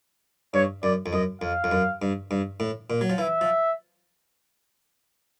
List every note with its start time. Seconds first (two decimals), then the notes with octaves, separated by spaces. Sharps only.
0.54 G2 C#5
0.83 F#2 D5
1.06 F2
1.13 F#2 D#5
1.42 F2 F5
1.64 F2
1.72 F#2
2.02 G2
2.31 G2
2.60 A2
2.90 A#2
3.01 F#3
3.10 F3
3.18 E3 E5
3.41 F3